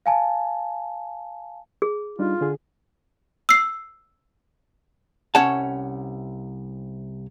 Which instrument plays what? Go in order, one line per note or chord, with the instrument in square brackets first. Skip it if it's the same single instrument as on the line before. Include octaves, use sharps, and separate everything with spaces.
[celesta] F5 G#5 A5
[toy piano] G#4
[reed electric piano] G3 D4 D#4 [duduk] F4
[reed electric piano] D3 G#4
[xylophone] E6 C7
[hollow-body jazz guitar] C2 C#4 C#5 F#5 A5